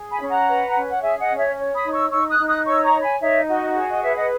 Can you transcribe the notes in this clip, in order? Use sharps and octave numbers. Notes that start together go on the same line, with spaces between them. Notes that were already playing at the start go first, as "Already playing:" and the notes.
Already playing: G#4
G#5 B5
C#4
F#5 A#5
B4
C#4
F#5
G#4 E5 G#5
D#5 F#5
C#4
C#5 E5
C#5
B5 D#6
D#4
C#6 E6
D#4 C#6 E6
D#6 F#6
D#4
D#6 F#6
C#5 C#6 E6
A#5 C#6
C#5
G#5 B5
D#4 C#5 E5
F#4 D#5
G#4 C#5
D#5
B4 C#5 E5
D#5 F#5